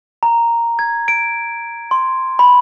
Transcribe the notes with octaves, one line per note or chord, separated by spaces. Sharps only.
A#5
G#6
D7
C6
B5